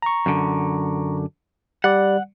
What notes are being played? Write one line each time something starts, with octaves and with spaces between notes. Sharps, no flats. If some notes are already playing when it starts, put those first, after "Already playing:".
A#5 C#6
F#2 D3
G3 D5 F#5